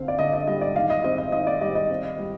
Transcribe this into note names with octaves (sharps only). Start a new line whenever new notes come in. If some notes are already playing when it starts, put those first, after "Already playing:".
Already playing: D3 C4 F5
D5
D3 D#5
D#5
G3 D#5
D5
D#3 F5
D#5
C4 D#5
D#5
D#3 D#5
D5
G3 D#5
D#5
C4
G3